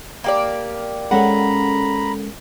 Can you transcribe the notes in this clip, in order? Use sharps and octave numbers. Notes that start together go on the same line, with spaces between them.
A#3 G4 D5
G#3 C#4 A4 F#5 A#5 B5